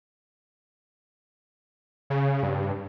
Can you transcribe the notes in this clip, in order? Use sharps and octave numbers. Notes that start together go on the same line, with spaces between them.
C#3
G2